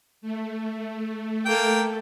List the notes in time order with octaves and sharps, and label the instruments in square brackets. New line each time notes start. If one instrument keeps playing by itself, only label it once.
[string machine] A3
[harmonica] A#3 G5 [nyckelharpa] A4